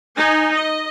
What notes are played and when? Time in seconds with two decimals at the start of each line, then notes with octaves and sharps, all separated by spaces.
0.16 D#4 G#5
0.53 D#5